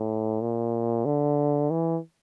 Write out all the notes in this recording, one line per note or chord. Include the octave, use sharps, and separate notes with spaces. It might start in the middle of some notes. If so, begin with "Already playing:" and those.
Already playing: A2
A#2
D3
E3